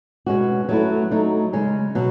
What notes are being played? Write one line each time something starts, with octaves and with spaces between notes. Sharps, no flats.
B2 G#3 C#4 F#4
F#3 A3 E4
F#3 A3 D#4
C#3 G#3 C#4
B2 F#3